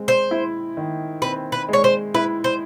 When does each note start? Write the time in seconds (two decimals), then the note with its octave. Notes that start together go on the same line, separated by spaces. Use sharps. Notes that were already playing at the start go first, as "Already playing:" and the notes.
Already playing: G#3 C4
0.08 C5
0.31 E4
0.77 D#3
1.22 C4 B4
1.52 B4
1.69 G#3 C#5
1.84 C5
2.14 E4 B4
2.44 C5